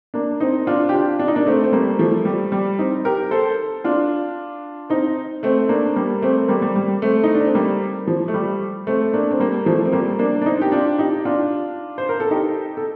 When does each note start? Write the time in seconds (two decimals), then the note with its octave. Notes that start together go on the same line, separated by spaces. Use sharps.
0.14 A#3 D4
0.40 C4 D#4
0.67 D4 F4
0.89 G4
0.93 D4 F4
1.19 D4
1.28 D#4
1.36 A#3 D4
1.47 A3 C4
1.64 C4
1.72 G3 A#3
1.99 F3 A3
2.25 G3
2.52 G3
2.79 C4 D#4
3.05 G4 A#4
3.31 A4 C5
3.84 D4 F4
4.90 C4 D#4
5.43 A3 C4
5.69 A#3 D4
5.96 G3 A#3
6.22 A3 C4
6.48 G3 A#3
6.62 G3
6.76 G3
7.02 A3 C4
7.24 D#4
7.35 D4
7.45 C4
7.55 G3 A#3
8.07 F3
8.28 A3
8.34 G3
8.87 A3 C4
9.13 A#3 D4
9.31 C4
9.40 G3 A#3
9.66 F3 A3
9.86 C4
9.93 G3 A#3
10.19 A#3 D4
10.42 D4
10.46 C4 D#4
10.62 G4
10.72 D4 F4
10.98 D#4 G4
11.25 D4 F4
11.98 C5
12.09 A#4
12.20 A4
12.31 D#4 G4
12.77 A4